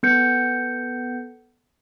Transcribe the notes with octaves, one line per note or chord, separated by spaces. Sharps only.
B3 A4 G6 C#7